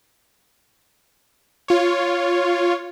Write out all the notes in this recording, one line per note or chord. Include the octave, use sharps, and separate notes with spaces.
F4 C#5